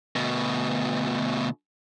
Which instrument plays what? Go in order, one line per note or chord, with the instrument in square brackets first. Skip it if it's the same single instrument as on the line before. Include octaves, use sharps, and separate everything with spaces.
[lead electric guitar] D2 B2